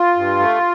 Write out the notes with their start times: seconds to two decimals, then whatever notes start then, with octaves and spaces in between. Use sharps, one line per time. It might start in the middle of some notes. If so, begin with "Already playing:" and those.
Already playing: F4
0.16 G2
0.39 A3